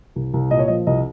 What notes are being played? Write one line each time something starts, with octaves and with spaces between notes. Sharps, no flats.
C2
C2
A#2 D#5
C#5
F3 D#5
C2 D#5